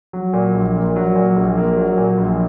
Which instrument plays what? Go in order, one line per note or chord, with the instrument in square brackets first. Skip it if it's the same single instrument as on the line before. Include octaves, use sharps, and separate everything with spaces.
[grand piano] F#3
A#2
A#1
A#3
F#3
A#2
A#1
A#3
F#3
A#2
A#1